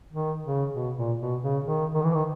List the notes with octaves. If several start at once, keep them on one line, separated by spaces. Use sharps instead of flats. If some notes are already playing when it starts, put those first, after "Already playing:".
D#3
C#3
B2
A#2
B2
C#3
D#3
D#3
E3
D#3